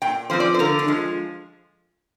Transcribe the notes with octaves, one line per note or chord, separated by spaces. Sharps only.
A#2 G5
F3 C4 C5
D5
C5
D3 A#4
D4
F3 G#3